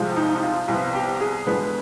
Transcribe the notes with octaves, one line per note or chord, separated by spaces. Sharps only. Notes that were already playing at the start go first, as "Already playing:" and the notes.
Already playing: C2 C3 F3 G#3
D#4
D#4
F4
C2 C3 F3 B3 F4
G4
G#4
D2 D3 G#3 B3 B4